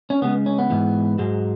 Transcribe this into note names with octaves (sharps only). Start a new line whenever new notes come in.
C#4
C#2 C#3 G#3 B3
C#4
B3
G#2 E3 G#3
G#2 F#3 G#3